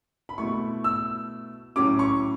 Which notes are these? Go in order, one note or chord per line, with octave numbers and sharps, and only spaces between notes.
B5
B2 A3 E4 C#6
E6
A2 F#3 C#4 D6
C#6